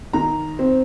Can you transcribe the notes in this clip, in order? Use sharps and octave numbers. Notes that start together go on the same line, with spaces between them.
D#3 A#5
C4